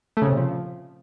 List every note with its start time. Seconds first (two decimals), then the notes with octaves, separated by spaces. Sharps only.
0.17 A3
0.22 C#3
0.27 C3
0.32 A#2
0.37 F3